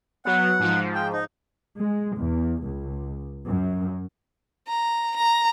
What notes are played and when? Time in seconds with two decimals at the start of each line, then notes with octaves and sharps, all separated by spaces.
0.25 F#3 B3 F#5
0.60 G#2 F3
0.95 G5
1.13 D#4
1.79 G#3
2.17 E2
2.66 C#2
3.47 F#2
4.68 A#5
5.17 A#5